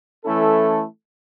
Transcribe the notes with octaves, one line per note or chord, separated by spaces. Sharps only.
E3 A3 C#4 E4 A4